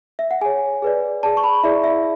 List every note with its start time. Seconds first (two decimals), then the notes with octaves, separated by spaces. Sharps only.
0.19 E5
0.31 F#5
0.41 G#4 C#5 G#5
0.82 G#4 B4 D5
1.23 G#4 D5 A5
1.37 C#6
1.44 B5
1.63 E4 G#4 D5 E5
1.84 E5